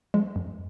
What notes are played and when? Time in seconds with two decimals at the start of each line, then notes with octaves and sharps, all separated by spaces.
0.14 F3 G#3
0.36 F#2